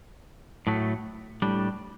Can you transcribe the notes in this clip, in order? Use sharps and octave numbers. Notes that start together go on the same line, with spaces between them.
A2 F#3 A3
A2 G3 D4